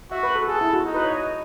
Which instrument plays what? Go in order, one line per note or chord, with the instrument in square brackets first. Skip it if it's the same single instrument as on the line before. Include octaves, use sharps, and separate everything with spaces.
[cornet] F#4 [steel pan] E5
[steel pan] B4
A4
[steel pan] G#4 [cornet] A4
[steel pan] E4
F#4
[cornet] D#4
[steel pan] B4
C#5
D#5